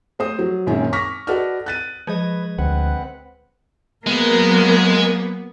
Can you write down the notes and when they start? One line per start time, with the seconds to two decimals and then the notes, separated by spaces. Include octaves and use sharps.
0.19 A3 C5 D#6
0.39 F#3
0.67 F#2 A#2 D#3 G#3 C4 C#4
0.93 C#6 D6 F6 A#6 B6
1.27 F#4 A4 B4 D5 D#5 F6
1.66 F#6 A6 D#7
2.07 F3 G#3 G#4 B4 D#5
2.58 D2 C4 B4 F#5
4.07 F#3 G#3 A#3 B3 A#4